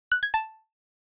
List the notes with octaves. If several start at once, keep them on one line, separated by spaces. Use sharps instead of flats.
F#6
G#6
A5